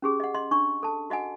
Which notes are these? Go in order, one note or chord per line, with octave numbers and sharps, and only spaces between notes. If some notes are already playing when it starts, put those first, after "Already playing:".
C#4 G4 G#4
D#5 F#5
D#5 C6
D4 C#6
A4 A5
F#4 D#5 F#5 G#5